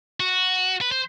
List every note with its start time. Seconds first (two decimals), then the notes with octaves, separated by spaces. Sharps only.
0.20 F#4
0.81 B4
0.92 C5